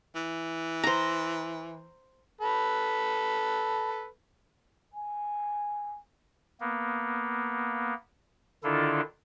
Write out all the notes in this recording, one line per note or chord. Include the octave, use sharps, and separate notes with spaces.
E3
C5 A#5
A4 B4
G#5
A#3 B3
D3 D#3 D4 E4 F4 A4